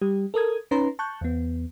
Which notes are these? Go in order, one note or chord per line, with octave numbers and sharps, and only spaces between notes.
G3 G4
A4 A#4 D#6 G#6
C#4 D#4 B4 A#5 C6
A5 C#6 F#6 G6
E2 B3